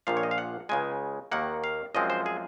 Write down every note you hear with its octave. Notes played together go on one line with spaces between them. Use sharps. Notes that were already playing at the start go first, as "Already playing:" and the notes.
A#1 A#2 F3 F5
C#5
D#5
F5
F#5
C#2 C#3 G#3 G#5
D#2 D#3 A#3 F#5
F5
F#2 F3 G#3 C4 D#5
C5
G#4